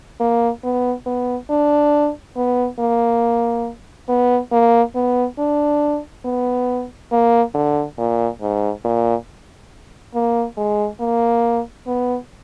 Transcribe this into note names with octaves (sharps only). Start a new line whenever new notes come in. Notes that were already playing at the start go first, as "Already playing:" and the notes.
A#3
B3
B3
D4
B3
A#3
B3
A#3
B3
D4
B3
A#3
D3
A#2
G#2
A#2
A#3
G#3
A#3
B3